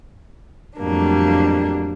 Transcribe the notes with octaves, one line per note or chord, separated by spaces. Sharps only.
F2 A2 F#3 G3 A#3 D4